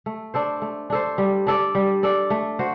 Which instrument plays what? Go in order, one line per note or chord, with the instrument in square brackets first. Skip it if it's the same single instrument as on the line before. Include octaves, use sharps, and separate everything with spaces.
[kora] A3
D4 A4 C5
A3
D4 A4 C5
G3
D4 A4 D5
G3
D4 A4 D5
A3
F#4 C5